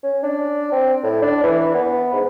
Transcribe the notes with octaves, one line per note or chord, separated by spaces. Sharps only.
C#4
D4
C4
A2
D4
E3
B3
G#2